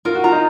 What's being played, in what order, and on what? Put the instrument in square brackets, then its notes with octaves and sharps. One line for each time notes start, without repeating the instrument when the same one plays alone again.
[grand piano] F4 [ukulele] A#4
[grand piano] F#4
[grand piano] F4 [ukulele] A#5
[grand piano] D#4